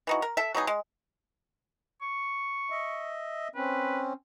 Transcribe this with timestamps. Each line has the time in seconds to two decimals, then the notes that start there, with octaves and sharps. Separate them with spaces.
0.07 E3 D#4 F#4
0.22 A#4
0.37 A4 E5
0.55 F#3 B3 D#4 G#4
0.67 G#3
2.02 C#6
2.71 D#5 E5
3.55 C4 C#4 B4